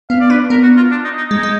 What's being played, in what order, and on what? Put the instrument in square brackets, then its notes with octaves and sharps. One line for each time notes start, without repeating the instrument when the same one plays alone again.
[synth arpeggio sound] B3 [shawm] F5
[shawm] D5
[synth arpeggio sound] D4 [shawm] B4
[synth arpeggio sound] B3 [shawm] A#4
[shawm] F#4
F4
D4
D#4
D#4
[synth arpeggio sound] G#3 [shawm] D#4
[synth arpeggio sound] G#3